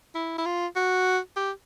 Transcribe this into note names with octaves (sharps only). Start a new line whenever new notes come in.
E4
E4
F4
F#4
G4